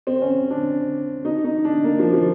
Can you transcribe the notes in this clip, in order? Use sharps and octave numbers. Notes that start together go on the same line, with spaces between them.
C4
C#4
D4
D#4
D#4
D4
A#3
F3
F3